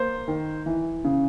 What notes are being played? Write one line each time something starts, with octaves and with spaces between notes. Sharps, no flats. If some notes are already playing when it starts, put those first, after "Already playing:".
Already playing: A#3 C5
D#3
E3
C#3